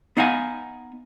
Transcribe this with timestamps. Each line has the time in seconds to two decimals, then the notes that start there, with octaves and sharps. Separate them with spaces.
0.17 B3 D#4 F5 F#5 G#5